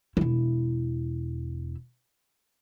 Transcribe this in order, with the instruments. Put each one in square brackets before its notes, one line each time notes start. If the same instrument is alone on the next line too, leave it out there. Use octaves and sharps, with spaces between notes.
[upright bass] E1 E4